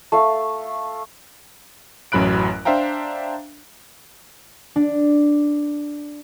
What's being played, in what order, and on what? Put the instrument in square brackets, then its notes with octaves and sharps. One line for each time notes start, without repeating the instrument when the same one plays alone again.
[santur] A3 F5
[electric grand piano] A1 F#2 F#3 B5 F#6 D7
D4 C5 E5 F5 G5 A#5
[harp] D4